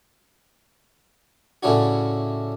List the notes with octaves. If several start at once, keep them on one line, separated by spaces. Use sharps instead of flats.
A2 C#3 C#4 D4 E4 F#4